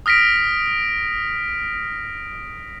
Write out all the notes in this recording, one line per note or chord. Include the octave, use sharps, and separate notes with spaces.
D#6 F6 A#6 B6 D7